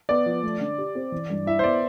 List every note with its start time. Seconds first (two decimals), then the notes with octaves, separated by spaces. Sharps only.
0.09 B3 D5
0.26 F3
0.43 A3
0.60 D3
0.78 G4
0.95 C4
1.12 E3
1.30 G2
1.46 E4 E5
1.59 C5
1.64 B3 D5